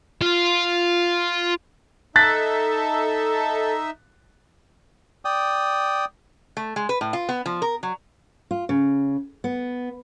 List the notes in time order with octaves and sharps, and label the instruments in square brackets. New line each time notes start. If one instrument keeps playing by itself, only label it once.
[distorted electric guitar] F4
[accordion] D#4 E5 [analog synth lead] A4 [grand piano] F#6 A6 B6
[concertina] D5 G5 D#6
[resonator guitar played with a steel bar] A3
G#3
B4
A2
F4
B3
F3
A#4
F#3
[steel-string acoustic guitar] F4
C#3
B3